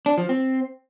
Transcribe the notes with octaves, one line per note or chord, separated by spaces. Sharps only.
D4
F3
C4